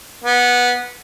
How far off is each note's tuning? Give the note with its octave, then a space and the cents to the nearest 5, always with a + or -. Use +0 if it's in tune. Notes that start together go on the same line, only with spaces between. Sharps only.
B3 -15